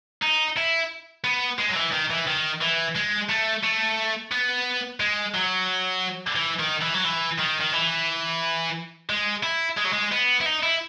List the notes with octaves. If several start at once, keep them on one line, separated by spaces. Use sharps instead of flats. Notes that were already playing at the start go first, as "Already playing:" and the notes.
D#4
E4
B3
G#3
F#3
E3
D#3
E3
D#3
E3
G#3
A3
A3
B3
G#3
F#3
E3
D#3
E3
F#3
E3
D#3
D#3
E3
G#3
E4
G#3
F#3
G#3
B3
E4
D#4
E4